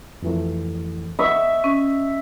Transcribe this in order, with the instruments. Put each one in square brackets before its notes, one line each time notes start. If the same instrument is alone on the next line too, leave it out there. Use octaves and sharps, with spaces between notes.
[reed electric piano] F2 E3 A3
[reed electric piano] D#5 [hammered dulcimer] E5 C#6
[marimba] C#4